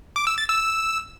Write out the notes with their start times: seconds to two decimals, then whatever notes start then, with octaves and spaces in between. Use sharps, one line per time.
0.16 D6
0.27 E6
0.38 A6
0.49 E6